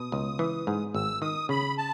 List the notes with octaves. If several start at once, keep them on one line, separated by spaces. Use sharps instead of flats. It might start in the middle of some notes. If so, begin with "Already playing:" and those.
Already playing: B2 D#6
C#2
E3
G#2
G#1 E6
D#3 D#6
C#3 B5
A5